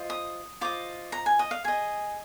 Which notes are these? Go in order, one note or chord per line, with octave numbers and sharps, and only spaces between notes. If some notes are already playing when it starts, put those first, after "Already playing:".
Already playing: F4 C5 D#5
D#6
F4 C5 D#5 D6
A#5
G#5
D#5
F5
G#4 D#5 G#5